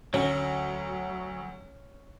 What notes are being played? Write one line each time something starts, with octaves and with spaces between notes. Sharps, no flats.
D2 F#3 C#4